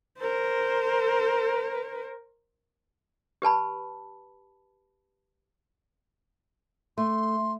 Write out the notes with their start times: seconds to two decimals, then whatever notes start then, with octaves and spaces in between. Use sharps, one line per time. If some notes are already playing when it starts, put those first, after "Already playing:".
0.19 A#4 C5
3.42 G4 B4 A5 B5
6.98 A3 C6